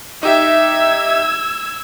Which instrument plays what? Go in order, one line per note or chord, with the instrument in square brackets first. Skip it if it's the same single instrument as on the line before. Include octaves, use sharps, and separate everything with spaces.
[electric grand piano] D#4 G4 E5 [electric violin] E6 G#6